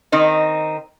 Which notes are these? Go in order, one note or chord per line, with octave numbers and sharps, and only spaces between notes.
D#3 C4 D#4